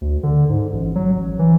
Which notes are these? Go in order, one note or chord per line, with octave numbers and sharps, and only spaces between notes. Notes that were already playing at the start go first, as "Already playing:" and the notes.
D2
D3
G#2
A1
F#3
A1
E3